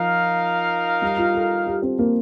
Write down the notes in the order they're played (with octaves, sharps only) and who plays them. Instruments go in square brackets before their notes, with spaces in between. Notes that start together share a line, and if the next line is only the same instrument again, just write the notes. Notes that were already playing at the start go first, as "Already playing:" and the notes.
Already playing: [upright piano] F3 [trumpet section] D#4 A#4 F5
[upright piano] G3
F4
A4
G4
C4
A#3